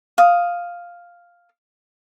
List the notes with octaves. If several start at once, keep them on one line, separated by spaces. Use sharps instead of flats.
F5 D#6